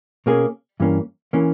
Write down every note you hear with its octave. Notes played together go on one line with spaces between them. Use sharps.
B2 A#3 C#4 G#4
G2 E3 A#3 C#4
E3 A#3 C#4